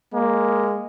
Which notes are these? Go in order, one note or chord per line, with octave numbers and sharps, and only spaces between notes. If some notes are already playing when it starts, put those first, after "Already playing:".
G#3 A#3